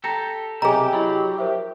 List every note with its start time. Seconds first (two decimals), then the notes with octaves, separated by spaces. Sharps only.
0.04 G4 A4 A#5 A#6 C#7
0.62 B1 C3 G4 G#4 D#5 G#5 A#5
0.93 F#3 E4 D#5 B5
1.38 A#4 C5 E5